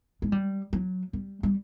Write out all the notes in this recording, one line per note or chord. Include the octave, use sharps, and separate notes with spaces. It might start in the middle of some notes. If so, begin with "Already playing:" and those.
G#3
G3
F#3
G3
G3